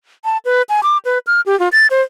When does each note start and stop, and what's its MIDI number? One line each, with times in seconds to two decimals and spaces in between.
0.25 0.37 81
0.45 0.62 71
0.69 0.81 80
0.83 0.98 86
1.05 1.18 71
1.27 1.41 89
1.46 1.58 67
1.60 1.68 65
1.72 1.87 93
1.91 2.01 72